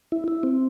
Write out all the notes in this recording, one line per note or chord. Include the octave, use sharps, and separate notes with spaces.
E4
E4
C4